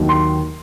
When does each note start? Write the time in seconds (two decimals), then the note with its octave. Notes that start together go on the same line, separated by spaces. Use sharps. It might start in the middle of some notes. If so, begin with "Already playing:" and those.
Already playing: D#2 D#3 F#3
0.09 C6